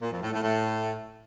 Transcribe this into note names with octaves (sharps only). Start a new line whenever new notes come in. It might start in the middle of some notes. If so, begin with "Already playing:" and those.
A#2
F2
A2
A2
A2